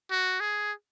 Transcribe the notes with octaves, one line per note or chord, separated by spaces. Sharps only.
F#4
G#4